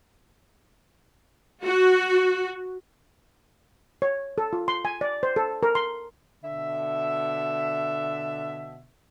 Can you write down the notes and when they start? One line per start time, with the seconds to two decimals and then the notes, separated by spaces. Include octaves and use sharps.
1.65 F#4
4.02 C#5
4.38 A4
4.53 F4
4.68 C6
4.85 G#5
5.01 D5
5.23 C5
5.36 A4
5.63 A#4
5.75 C6
6.44 B2 D3 E5